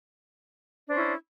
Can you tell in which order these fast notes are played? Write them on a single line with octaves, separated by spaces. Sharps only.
D4 C5 C#4 E4